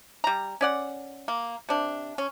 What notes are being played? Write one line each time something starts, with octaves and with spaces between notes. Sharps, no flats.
G3 A#5
C#4 D5 F#5
A#3
C3 D4
C#4